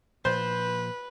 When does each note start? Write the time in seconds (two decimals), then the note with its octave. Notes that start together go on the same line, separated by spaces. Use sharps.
0.25 A#2 F3 B4 C5